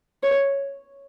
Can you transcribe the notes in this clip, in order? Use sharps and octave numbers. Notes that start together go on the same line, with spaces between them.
C#5